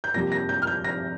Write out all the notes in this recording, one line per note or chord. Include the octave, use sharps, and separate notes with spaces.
G6
F2 C3 G3 A#3 A#6
A#6
G6
F6
G6
A#6